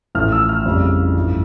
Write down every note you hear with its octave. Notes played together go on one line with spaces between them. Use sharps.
A1 A2 F3 A3 F6
E6
F6
F2 C#3 G3
A1 G2 F3 A3 E4